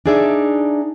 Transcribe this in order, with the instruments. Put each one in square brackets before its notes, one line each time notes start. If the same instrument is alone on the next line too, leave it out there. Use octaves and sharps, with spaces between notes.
[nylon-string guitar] D4 D#4 G#4 D5 E5